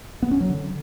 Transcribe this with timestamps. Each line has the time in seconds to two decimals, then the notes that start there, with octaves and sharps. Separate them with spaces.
0.22 B3
0.31 C#4
0.40 F#3
0.49 D3